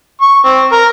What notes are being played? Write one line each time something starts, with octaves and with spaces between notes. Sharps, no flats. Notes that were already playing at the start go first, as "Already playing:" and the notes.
C#6
C4
A#4